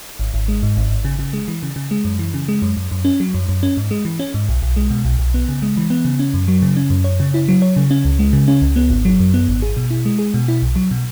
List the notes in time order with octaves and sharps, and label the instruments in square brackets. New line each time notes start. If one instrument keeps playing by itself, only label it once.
[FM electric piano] G#1
G#1
G#3
G#2
G#1
G#1
C#3
C#3
G#3
E3
C#3
C#3
G#3
F#2
E3
C#3
G#3
F#2
F#2
F#2
C#4
F#3
F#2
F#2
C#4
G#2
G#3
E3
C#4
G#2
B1
B1
G#3
B2
B1
B1
B3
C#3
G#3
E3
B3
C#3
C#4
F#2
F#3
C#3
C#4
F#2
C#5
C#3
E4
F#3
C#5
C#3
C#4
C#2
G#3
C#3
C#4
C#2
B3
G#1
F#3
F#2
B3
G#1
G#4
B2
E4
G#3
G#4
B2
E4
B1
F#3
B2